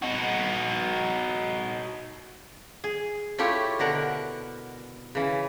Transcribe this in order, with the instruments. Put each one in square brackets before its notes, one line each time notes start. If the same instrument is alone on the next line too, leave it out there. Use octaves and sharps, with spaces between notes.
[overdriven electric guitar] D#4 F#4
[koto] G#4
A3 E4 F4 G4 C#5
B2 D3 A#4 F#5
C#3 E3